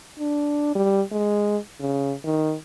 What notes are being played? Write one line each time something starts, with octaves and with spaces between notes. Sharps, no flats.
D4
G3
G#3
C#3
D#3